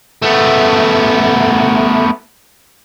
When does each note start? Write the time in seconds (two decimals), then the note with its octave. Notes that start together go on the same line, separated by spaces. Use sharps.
0.22 A3 B3